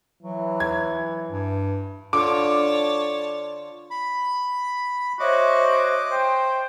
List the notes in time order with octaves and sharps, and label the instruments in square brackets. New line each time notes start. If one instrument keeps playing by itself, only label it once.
[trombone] E3 [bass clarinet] F#3
[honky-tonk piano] G#6
[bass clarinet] G2
[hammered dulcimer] D3 F4 [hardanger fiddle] C#5 A5 [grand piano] D6
[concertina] B5
[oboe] F#4 [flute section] C5 C#5 E5 [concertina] D#5 D6
[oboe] C5 [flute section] G5